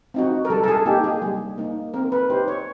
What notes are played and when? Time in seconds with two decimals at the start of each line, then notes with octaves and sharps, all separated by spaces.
0.14 C4 D#4 F#4
0.45 A#4
0.50 G3 A4
0.64 A4
0.68 G#4
0.86 A#3 D#4 G4
1.04 G#4
1.22 G3
1.58 A#3 D#4
1.94 C4 A#4
2.12 B4
2.30 D#4 G4 C5
2.48 C#5